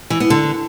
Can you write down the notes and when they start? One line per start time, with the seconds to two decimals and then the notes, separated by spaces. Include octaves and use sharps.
0.10 E3
0.20 B3
0.30 D3